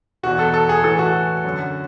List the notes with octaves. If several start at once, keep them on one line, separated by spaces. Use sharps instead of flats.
E2 B2 F#4
A4
A4
G#4
A2 E3 A4
F#4
F#2 D3